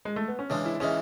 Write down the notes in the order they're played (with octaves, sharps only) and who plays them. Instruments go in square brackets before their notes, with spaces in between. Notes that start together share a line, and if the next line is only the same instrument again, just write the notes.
[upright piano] G#3
A3
B3
C#4
[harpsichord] C#3 E3 G#3 [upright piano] D4
[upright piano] E4
[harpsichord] C#3 E3 G#3 [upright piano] C#4